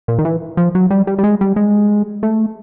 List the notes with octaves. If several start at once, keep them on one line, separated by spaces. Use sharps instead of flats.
A#2
D#3
E3
F3
F#3
G3
G3
G3
G#3
G3
G#3
A3